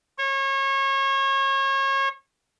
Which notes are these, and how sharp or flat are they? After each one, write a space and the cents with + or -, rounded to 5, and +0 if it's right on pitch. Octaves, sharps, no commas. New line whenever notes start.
C#5 -30